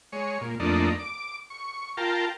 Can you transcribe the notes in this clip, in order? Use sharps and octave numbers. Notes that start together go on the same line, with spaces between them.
G#3 C#5
A#2
F2 A3 A#3 D4 D#4
D6
C#6
F4 A#4 G5 A5